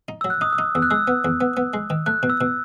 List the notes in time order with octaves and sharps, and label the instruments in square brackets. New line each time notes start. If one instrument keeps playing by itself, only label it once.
[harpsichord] D#4
[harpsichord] F#3 [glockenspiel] E6
[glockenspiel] F#6
[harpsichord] D#4 [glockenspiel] D#6
[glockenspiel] E6
[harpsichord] D#4
[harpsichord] E2 [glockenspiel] E6
[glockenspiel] F#6
[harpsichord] G#3 [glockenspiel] E6
[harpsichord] B3
E2
B3
B3
G#3
D#3
[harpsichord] A3 [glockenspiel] F#6
[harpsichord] B2
[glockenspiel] E6
[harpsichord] B2